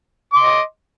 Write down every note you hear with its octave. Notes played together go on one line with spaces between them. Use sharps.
D#5 C6 D6